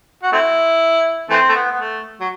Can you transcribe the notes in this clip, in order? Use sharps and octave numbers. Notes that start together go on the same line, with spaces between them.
F#4
A3 C4 E4
E3 A3 C4
A3
B3
B3
A3
F#3